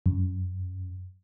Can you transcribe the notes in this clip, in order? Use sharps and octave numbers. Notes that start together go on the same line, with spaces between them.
F#2